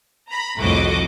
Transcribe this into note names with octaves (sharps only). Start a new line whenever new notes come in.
A#5 B5
C2 F2 A2 F#4 D#5 D6